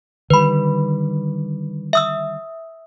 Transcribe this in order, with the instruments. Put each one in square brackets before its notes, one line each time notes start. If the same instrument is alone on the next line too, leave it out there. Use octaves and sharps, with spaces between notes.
[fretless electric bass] D3 D#3 G3 [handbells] B4 B5
[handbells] E5 D#6 E6